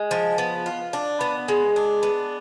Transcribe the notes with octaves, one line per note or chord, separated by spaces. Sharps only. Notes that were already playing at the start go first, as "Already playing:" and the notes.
Already playing: G#3
F3
B3
F4
D4
B3
G#3
D4
B3